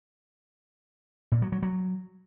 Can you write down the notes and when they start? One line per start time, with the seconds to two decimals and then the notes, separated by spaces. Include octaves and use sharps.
1.32 A#2
1.42 F#3
1.52 F#3
1.63 F#3